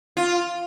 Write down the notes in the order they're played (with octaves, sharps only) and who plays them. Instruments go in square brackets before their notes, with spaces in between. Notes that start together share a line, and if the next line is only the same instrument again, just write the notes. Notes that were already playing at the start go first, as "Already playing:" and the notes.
[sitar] F4